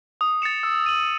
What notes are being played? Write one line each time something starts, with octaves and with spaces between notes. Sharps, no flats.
D#6
A6 C#7 E7
E6
A6 D#7 F#7